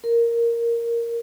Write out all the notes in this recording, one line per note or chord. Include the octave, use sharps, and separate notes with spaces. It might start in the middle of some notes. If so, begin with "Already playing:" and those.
A#4